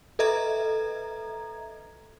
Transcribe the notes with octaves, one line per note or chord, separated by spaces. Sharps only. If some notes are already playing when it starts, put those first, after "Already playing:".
A4 B4 D#5 E5 A#5 G#6